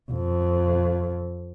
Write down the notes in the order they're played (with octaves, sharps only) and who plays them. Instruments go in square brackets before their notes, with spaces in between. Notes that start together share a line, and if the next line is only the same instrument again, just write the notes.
[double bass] F2